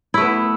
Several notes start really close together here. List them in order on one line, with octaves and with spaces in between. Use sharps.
E4 A3 B3